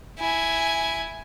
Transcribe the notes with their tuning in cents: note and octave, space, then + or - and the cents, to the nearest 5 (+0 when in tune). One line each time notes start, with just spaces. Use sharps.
E4 +0 G#5 +0